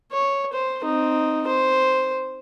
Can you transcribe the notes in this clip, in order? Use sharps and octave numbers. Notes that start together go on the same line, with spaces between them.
C#5
C5
C4 D#4
C5